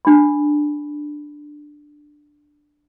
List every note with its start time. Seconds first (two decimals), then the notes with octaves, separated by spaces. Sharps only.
0.05 D4 B5